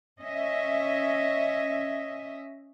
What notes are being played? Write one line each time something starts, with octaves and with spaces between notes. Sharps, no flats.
C#4 D#5 E5